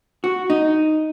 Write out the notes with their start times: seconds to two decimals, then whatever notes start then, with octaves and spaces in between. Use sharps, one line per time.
0.24 F#4
0.50 D#4